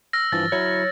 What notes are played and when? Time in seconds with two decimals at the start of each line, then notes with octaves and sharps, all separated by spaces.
0.13 E6 F6 A#6
0.32 G2 E3 F3 A6
0.52 F#3 E4 C#5